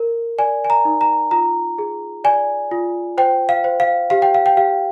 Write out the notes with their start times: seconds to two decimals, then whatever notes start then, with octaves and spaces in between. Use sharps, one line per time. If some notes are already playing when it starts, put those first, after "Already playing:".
Already playing: A#4
0.38 D5 G#5
0.64 G#5
0.70 A#5
0.85 D#4
1.01 A#5
1.31 F4 A#5
1.78 G#4
2.24 D5 G#5
2.71 F4
3.18 C5 G5
3.49 F5
3.64 C5
3.80 F5
4.10 G4 F5
4.22 G5
4.34 F5
4.46 G5
4.57 G4 F5